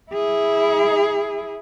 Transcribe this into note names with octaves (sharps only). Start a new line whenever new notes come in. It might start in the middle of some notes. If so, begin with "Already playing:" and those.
E4 G#4